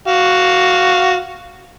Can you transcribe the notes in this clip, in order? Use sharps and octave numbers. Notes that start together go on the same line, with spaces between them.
F#4 F5